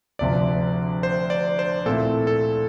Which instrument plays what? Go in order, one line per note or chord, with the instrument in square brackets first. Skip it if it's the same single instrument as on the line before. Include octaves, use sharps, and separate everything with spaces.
[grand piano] D2 C3 F3 [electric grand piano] D5
[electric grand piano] C5
D5
C5
[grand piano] A#2 A3 C4 E4 [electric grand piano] A4
[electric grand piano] A4